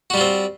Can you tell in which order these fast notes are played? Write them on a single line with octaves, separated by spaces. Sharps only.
F#4 G3 F4 C4